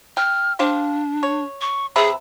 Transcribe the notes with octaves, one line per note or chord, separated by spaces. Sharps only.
G5 F6
D4 G4 C5 F5
C#5
C#6
C3 G#4 B4 E5